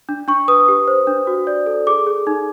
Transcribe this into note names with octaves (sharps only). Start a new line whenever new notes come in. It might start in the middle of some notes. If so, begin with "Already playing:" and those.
D4
D4 C#6
B4 D#6
G4
C5
D4
F#4
D5
A4
G#4 D6
G#4
D#4